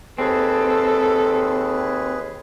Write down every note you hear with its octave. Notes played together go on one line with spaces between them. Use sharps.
D#2 C4 G#4 A4 B4